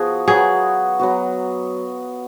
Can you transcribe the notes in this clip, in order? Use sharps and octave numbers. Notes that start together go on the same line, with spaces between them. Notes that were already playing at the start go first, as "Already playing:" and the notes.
Already playing: F3 B3 F#4 G#4
F#3 B3 F#4 G#4
F#3 B3 F#4